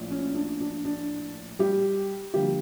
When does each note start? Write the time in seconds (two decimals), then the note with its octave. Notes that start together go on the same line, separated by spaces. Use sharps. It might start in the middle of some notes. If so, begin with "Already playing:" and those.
Already playing: A#1 A2 F3 A3
0.10 C#4
0.34 D4
0.60 D4
0.85 D4
1.59 G3 G4
2.34 D3 F3 G3 A#3 G4